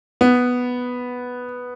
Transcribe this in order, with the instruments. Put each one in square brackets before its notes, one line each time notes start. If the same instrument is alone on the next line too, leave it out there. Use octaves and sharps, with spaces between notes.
[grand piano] B3